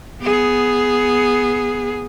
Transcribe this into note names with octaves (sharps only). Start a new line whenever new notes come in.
B3 G#4